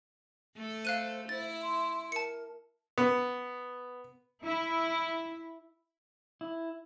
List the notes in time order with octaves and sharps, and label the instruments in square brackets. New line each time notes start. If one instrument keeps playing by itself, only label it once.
[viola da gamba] A3 A4
[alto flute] C5 [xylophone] F5 F#6 D#7
[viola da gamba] E4 [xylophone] A6
[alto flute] C6
[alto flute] A#4 [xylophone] A5 C#7
[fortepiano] B3
[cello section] E4
[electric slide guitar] E4